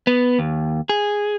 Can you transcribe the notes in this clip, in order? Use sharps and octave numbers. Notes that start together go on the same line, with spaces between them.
B3
D#2
G#4